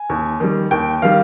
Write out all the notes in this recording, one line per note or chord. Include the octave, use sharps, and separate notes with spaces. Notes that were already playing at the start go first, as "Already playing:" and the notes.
Already playing: G#5
D#2
D#3 G3
D#2 G5
D#3 G3 F5